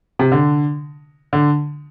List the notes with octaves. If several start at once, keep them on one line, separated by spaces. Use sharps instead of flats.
C3
D3
D3